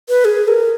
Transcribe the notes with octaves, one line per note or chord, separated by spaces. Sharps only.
B4
G#4
A#4